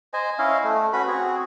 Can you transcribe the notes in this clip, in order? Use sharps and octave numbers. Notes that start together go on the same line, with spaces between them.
C5 D#5 G#5
C#4 E4 D#5 F5
A3
C#4 F#4 B4 B5
C4 F#4 G#4